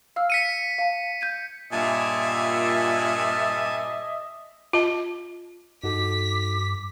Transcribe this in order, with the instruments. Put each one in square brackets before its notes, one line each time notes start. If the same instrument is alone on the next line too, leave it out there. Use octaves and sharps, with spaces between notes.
[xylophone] F5 E6 F6
[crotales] B6 C#7 D#7
[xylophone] F5 A5
G6 G#6 D#7
[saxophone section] G2 A#2 [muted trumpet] D#5 [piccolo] E5 [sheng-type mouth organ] G#5 A5
[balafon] F4 D#5 A5
[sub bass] G2 [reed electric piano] D#4 F#4 A4 [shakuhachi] D6 [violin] B6